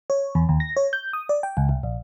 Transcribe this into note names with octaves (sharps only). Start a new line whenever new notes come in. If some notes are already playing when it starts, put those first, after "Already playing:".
C#5
E2
D#2
A#6
C#5
G6
D#6
D5
G5
C#2
C2
A#1